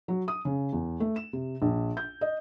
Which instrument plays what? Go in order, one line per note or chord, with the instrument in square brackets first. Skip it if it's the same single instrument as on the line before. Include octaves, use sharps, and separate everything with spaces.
[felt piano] F#3
D#6
C#3
E2
A3
E7
C3
A#1
G6
D#5